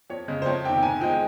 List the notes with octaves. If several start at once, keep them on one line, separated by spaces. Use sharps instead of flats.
F2 C#5
C#3 G#3
C5
F2 C#5
C3 D#3 G5
G#2 G#5
F3 G#3 G5